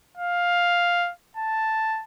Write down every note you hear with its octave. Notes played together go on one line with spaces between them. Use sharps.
F5
A5